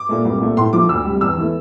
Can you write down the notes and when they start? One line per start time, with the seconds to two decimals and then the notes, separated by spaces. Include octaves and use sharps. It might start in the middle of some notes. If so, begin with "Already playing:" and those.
Already playing: D6
0.09 A#2 A3
0.25 C2
0.41 A#2 A3
0.57 A2 C6
0.73 F3 A3 D6
0.89 D2 E6
1.05 C3 G3
1.21 E2 E6
1.37 E3 A3